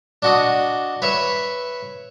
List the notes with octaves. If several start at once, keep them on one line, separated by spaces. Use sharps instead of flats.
D4 F#4 D#5
B4 C#5 E5